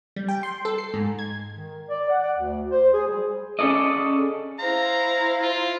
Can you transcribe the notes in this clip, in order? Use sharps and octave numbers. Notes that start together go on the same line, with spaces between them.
G3
G5
C6
A4
C7
G#2
G#6
D#3
D5
F#5
D5
D2
C5
G#4
G3
C#4 G#4 A4 D5 D#5
E4 C5 F5 A#5
F4